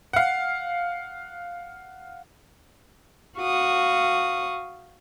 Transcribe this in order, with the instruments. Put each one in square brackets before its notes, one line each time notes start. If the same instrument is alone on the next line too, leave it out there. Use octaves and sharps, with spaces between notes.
[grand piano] F5 F#5
[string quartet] F#4 F5 C#6 D#6